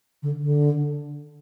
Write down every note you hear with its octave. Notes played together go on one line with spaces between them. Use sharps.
D3
D3